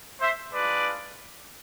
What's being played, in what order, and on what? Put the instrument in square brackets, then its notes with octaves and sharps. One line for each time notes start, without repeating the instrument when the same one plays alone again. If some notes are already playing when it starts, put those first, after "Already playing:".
[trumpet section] C5 E5
G#3 D4 F4 B4 D5